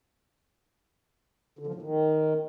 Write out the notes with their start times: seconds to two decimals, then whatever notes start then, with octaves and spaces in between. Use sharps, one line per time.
1.59 D3
1.67 F3
1.74 A2
1.82 D#3